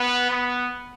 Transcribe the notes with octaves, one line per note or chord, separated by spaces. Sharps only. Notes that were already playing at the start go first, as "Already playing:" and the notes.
Already playing: B3
B3